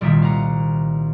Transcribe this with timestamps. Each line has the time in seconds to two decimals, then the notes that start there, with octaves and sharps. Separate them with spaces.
0.01 F1 C2 A#2 D#3 A#3 E5
0.22 F5 F#5 A#5